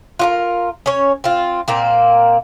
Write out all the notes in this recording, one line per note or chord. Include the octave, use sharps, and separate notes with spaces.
F4 F#4 A#4
C#4 C#5
C4 F4
A#2 A#3 C4